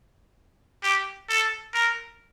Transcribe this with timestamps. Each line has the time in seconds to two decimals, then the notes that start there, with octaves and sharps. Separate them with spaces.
0.83 G4
1.28 A4
1.74 A#4